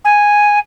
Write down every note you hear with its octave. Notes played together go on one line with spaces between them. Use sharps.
G#5